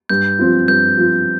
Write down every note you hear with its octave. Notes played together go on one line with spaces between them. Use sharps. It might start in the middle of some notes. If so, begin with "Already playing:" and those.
G2 G6
F3 C4 F4
G2 G6
F3 C4 F4